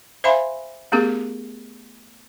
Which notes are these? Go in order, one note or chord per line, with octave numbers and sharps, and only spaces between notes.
C5 E5 F5 G#5 B5 C6
A3 B3 C#4 G4 G#4 A#4